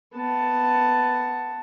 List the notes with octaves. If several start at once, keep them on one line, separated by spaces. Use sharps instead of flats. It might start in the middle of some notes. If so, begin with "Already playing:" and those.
B3 A5